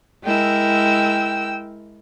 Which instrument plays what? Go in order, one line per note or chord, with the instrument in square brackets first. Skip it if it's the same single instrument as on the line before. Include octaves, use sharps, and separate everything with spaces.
[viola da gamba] G#3 E4 A#4 [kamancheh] G5 E6